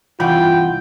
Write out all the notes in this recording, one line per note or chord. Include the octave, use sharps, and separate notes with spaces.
C2 E3 F4 F#5 G5 B5